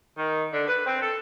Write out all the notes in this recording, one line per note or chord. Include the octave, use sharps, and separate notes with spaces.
D#3
D3
B4
C4
A4